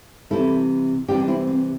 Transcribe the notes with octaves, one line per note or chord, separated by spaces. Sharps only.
C3 E3 G3 E4 A4
C3 E3 G3 D4 G4
D4
C4 E4
C4